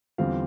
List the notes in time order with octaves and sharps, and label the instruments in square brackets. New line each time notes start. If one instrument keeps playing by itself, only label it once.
[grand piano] E2 D3 G3 C4 F4 F5